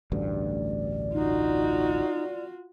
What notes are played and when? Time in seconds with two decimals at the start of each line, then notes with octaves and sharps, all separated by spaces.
0.12 A1 D2 G2 D5
1.13 D#4 F4 F#4